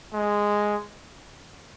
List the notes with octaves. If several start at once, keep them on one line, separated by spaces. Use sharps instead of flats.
G#3